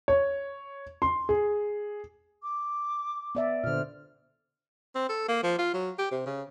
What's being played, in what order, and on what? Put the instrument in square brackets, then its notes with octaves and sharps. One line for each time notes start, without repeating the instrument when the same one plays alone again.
[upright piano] C#5
C6
G#4
[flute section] D6
[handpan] B3 D5 E5
[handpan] A#2 D3 [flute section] C5 F6
[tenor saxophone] C4
A4
A#3
F3
F4
F#3
G4
C3
C#3